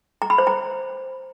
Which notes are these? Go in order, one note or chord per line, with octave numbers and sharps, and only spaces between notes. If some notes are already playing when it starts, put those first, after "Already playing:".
A#5
B5
C5
A#5